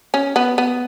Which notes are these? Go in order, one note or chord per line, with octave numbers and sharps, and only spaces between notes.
C#4
B3
B3